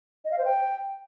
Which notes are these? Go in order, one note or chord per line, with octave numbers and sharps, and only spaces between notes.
D#5
F5
C5
G5